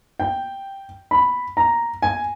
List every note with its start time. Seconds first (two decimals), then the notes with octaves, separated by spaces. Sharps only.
0.20 G5
1.11 B5
1.57 A#5
2.02 G#5